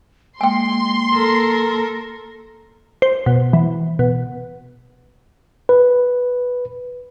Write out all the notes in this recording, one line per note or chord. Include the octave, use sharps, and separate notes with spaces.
G#3 A#3 G5 G#5 C6
A4 A#4
C5
B2
E3
B2
B4